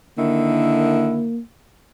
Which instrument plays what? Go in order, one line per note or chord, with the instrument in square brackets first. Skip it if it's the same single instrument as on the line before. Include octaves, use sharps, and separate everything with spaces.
[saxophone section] D3 D#3 E4 [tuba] A#3